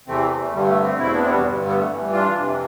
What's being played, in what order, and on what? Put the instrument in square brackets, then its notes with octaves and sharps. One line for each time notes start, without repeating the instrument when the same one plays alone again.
[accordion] E2 C3 E3 A3 C4
A3
G2 D3 G3
A3
A3 C4
E2 B2 C4 E4
B3 D4
C4
G3 B3
G2 D3 G3
G3 B3
A3
G2 E3
D4 F4
F2 C3 E3